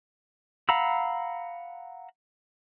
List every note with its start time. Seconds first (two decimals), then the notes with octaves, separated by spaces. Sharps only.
0.69 F5 F#5 A#5 B5 E6